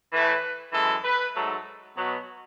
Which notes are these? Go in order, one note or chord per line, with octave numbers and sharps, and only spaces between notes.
A2 E3 A3 B4
F#2 E3 G#3 A4
B4
G#2 F#3 A3 A4
B2 F#3 B3